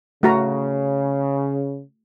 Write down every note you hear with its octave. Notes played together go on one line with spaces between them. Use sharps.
C#3 A3 F#4 A#5